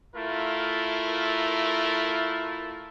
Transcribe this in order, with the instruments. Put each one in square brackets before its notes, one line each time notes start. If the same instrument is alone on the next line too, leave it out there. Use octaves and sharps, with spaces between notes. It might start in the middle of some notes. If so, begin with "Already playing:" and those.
[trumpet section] A3 E4 F4 A#4